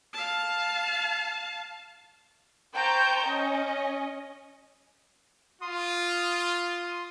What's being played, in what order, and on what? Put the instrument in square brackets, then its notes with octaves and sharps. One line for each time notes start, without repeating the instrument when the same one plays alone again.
[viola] F5 A5
[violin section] C5 G5 A5 A#5 C#6 G6
C#4 D#5
[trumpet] F4 [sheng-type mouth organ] C6 D#6